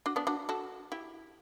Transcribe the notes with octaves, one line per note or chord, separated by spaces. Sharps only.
D4 F#4
B3 D4
D4 F#4
F#4 A4
E4 G4